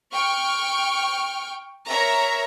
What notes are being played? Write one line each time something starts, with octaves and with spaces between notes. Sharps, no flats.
G5 C#6 F6
A#4 C#5 E5 A#5